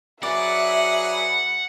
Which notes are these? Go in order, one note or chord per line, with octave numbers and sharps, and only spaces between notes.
F#3 G#4 B4 D5 E5 F#5